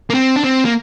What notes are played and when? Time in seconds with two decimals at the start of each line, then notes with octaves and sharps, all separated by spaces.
0.10 A#3
0.14 C4
0.36 D4
0.44 C4
0.65 A#3